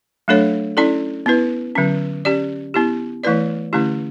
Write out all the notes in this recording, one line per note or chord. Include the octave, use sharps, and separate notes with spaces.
F#3 A3 D4 A4 C#5
C#4 E4 A4 D5
B3 E4 B4
D3 F#3 C#4
C#4 G4 D5
B3 E4 G4
E3 A3 E4 B4 D5
D3 A3 C#4 E4 G4